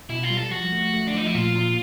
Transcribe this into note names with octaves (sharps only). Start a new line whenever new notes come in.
B2 E4
F4
G3
A4
F3 F#4
A3
A3
D4
F3 D#4
E4
A#2 F4
A#2